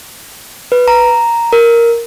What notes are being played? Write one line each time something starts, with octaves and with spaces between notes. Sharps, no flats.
B4
A#5
A#4